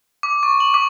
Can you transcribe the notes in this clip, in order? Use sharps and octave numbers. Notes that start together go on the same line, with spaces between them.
D6
C#6
F#7
D6